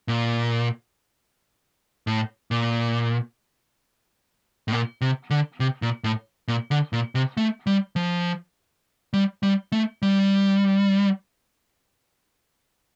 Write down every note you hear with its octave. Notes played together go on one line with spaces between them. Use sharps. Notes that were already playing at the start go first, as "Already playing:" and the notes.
A#2
A2
A#2
A2
A#2
C3
D3
C3
A#2
A2
A#2
D3
A#2
C3
A3
G3
F3
G3
G3
A3
G3